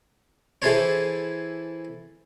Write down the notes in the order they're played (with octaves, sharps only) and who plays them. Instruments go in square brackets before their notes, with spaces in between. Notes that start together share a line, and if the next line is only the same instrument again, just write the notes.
[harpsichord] E3 E4 G#4 A4 C5 C#5